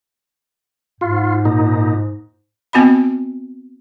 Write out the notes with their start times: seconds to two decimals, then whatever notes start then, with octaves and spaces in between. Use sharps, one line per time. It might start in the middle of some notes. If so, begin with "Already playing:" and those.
1.01 G#2 F4
1.45 A#2 D#4
2.73 B3 C4 F#4 D#5 B5